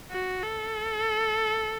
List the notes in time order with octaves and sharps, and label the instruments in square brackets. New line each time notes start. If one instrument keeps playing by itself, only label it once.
[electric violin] F#4
A4